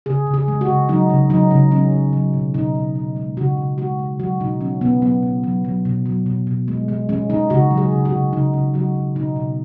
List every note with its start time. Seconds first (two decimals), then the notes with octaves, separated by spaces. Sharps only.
0.06 C#3 G#4
0.27 C#3
0.34 G#4
0.48 G#3
0.61 F#4
0.68 C#3
0.89 F#3 D#4
1.10 C#3
1.30 F#3 D#4
1.51 C#3
1.71 F#3 C#4
1.92 F#3
2.13 F#3
2.33 B2
2.54 B2 D#4
2.75 B2
2.96 B2
3.16 G#3
3.37 C#3 F#4
3.57 C#3
3.78 G#3 F#4
3.99 G#3
4.19 F#3 F#4
4.40 B2 D#4
4.61 F#3 C#4
4.81 B2 B3
5.02 F#3 B3
5.23 B2
5.43 F#3
5.65 F#3
5.85 B2
6.06 F#3
6.26 B2
6.47 B2
6.68 G#3
6.88 G#3
7.09 G#3 C#4
7.30 G#3 D#4
7.50 C#3 F#4
7.71 F#3
7.77 G#4
7.92 C#3
8.05 F#4
8.12 C#3
8.33 C#3 D#4
8.53 C#3
8.74 F#3 F#4
8.95 F#3
9.15 B2 D#4
9.36 B2